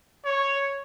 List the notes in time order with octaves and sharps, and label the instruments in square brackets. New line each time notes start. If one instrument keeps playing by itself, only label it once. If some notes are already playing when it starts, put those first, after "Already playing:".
[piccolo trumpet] C#5